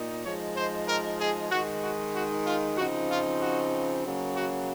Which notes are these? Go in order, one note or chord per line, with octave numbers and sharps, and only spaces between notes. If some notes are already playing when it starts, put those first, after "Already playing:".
Already playing: A#2 D#4
F3 G#3 D#4 C#5
C5
A#4
G#4
D#3 G#3 D#4 F#4
F#4
F#4
F4
C#3 F3 C4 D#4 F#4
F4
F#4
C#3 F#3 A#3
F#4